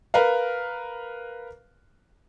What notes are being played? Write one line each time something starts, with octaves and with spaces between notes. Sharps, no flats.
A#4 B4 F5